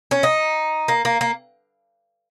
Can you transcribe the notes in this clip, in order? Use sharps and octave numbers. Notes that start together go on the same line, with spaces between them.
C#4
D#4
A#3
A#3
A#3